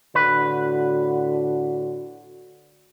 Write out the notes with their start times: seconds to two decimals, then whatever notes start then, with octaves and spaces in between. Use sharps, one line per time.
0.15 A2 D3 F#4 B4